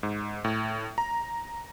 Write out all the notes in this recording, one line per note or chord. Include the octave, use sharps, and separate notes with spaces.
G#2
A2
A#5